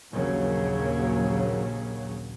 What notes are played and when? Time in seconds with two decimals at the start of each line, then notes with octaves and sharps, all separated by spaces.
0.12 A#1 D#2 C#3 F#3